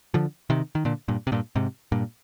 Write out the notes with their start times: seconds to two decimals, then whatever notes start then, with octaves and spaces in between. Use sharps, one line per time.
0.14 D3 F3
0.50 C3 D#3
0.75 D#3
0.85 A#2 D3
1.08 G2 A#2
1.27 C3
1.32 G2 A#2
1.56 G#2 C3
1.92 G2 A#2